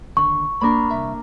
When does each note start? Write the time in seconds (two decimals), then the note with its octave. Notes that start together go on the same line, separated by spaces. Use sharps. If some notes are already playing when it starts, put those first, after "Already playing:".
0.17 D#2 D3 C#6
0.61 A#3 D4 A#4 B5
0.91 C2 E5